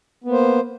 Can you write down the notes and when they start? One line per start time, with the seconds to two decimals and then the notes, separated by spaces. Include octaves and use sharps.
0.24 B3
0.28 A#3
0.32 C5